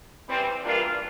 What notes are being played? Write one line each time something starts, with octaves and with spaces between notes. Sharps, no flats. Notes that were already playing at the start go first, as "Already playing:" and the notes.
E3 G3 C4
G2 E3 A#3 D4 F4